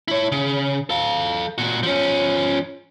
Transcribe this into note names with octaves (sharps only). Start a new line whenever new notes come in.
E4 C#5
C#3
A4 F5
A#2 F#4
F3 C#4